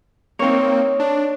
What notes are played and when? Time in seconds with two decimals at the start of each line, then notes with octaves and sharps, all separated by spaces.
0.39 A#3 C4 D#4 C#5
1.00 D4